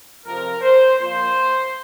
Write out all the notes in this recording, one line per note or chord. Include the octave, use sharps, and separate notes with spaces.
F2 C3 F3 A#4
C5
A#2 F3 C5